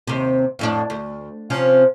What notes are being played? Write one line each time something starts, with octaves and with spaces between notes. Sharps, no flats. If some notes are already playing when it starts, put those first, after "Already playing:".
D#2 C3
F2 A2 D4
D2
C3 F3 C#4